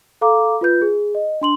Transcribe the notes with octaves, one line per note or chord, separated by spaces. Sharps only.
A4 F5 A#5 D6
F4 B4 G6
G#4
D#5
D4 C6 F#7